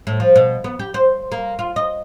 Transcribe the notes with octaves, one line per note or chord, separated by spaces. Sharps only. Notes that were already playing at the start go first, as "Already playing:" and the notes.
A2
F3
B2
B3
G4
C5
A#3
F4
D#5